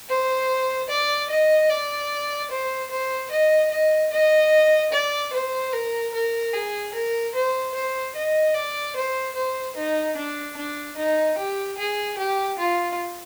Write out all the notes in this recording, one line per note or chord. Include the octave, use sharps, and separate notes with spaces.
C5
D5
D#5
D5
C5
C5
D#5
D#5
D#5
D5
C5
A#4
A#4
G#4
A#4
C5
C5
D#5
D5
C5
C5
D#4
D4
D4
D#4
G4
G#4
G4
F4